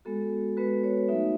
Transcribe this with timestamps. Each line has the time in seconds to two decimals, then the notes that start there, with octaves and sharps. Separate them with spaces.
0.05 G#3 B3 F#4 A4
0.57 G#3 B3 F#4 B4
0.83 C#5
1.08 F#3 A3 D#4 F#4 E5